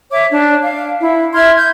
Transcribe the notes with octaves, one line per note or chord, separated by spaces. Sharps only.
C#5 E5 D6
D4 A5
F5
E4
E5 C6 F6 G#6
G6 G#6